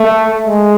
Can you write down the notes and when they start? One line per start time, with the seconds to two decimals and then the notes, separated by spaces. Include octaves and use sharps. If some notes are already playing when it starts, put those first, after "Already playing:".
Already playing: A3
0.47 G#3